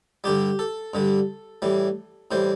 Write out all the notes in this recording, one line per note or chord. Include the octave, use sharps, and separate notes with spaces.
G2 D3 G3 G4
A4
G2 D3 G3
A2 E3 G3
A2 E3 G3 C5